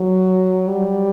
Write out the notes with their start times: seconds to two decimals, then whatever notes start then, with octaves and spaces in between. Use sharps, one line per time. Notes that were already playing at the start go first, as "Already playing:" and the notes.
Already playing: F#3
0.68 G3